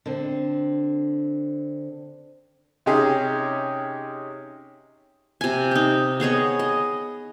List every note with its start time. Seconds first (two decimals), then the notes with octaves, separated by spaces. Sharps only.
0.06 D3 C4
2.86 C3 C#4 D#4 G4 G#4
5.41 C3 G#5
5.71 D#4 G4
6.20 B3 G#4 C#5 D#5
6.59 D#5